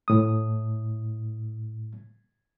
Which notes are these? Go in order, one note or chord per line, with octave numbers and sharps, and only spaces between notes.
A2 D#6